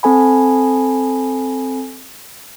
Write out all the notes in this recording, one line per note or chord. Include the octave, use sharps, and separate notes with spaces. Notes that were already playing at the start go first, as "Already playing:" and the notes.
C4 A4 G#5 B5